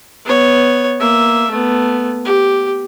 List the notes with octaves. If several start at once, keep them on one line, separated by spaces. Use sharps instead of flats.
B3 C#5
A#3 E5
A3 B3
G4